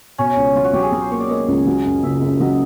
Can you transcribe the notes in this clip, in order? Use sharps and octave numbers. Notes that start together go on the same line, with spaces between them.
B2 C#4
C#2
F#3 F4
F#4
F#3 G4
G#4
F#3 A#4
C5
A#3 C#5
D5
A#3 D#5
C#2
F#3
F#2
F#1 E5
F#2
F#3 D#5